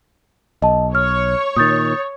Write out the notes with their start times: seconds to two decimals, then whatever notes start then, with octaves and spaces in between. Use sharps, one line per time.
0.62 B1 D#5 A5
0.95 C#5 F6
1.56 A#2 D#3 D#6 G6 A6